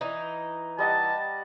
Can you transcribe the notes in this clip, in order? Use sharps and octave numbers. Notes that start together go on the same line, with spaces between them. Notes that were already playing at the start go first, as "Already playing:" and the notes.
E3 D#4
G3 D#5 F#5 A5